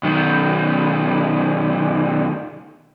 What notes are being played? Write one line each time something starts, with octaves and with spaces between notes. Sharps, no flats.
B1 D#3